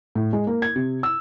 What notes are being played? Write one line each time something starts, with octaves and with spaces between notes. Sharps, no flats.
A2
G#3
A#3
G#6
C3
E6